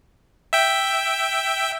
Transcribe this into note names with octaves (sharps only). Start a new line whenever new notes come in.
E5 G5